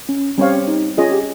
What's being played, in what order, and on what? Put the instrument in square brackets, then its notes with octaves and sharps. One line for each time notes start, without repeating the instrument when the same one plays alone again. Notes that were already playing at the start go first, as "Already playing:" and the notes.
[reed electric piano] C#4
[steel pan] G3 C4 G4 C#5 F5 [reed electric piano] C#4
[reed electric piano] D#4
[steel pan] C#4 G#4 D#5 [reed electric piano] F4
[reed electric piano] G4